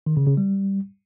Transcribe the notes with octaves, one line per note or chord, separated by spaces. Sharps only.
D#3
C#3
C#3
G3